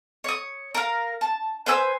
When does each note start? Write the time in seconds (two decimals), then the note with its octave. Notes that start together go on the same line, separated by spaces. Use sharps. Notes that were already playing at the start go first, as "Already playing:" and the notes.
0.24 C#5 D#6
0.74 A#4 F5
1.21 A5
1.66 B4 C5 G#5 E6